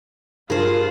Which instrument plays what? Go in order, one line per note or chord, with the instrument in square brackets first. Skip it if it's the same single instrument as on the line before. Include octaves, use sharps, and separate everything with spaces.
[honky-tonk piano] G2 [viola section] F4 [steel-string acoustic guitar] G#4 C5 [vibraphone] A#4